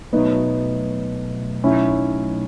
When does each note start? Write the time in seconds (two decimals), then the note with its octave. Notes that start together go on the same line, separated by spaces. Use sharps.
0.13 B2 F#3 A3 B3 D#4
1.64 B2 F#3 A3 C#4 D#4 E4